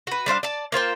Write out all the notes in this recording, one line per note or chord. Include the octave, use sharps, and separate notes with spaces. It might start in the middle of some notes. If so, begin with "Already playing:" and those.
F#4 B4
G3 D4 C5 F5
D5 A5
A#3 F4 C5 G5